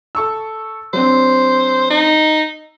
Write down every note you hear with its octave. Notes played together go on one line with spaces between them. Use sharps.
A4 C#6 E6
F#3 C4 D4 C5
D#4